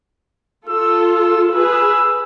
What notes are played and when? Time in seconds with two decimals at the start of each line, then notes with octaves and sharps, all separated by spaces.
0.68 F4 A4 E6
1.12 E6
1.54 G#4 B4 E6